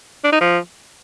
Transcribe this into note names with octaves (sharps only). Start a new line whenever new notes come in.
D4
D#4
F3